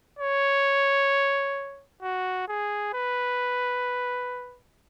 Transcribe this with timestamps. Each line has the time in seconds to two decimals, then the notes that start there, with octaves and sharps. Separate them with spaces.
0.19 C#5
2.03 F#4
2.48 G#4
2.94 B4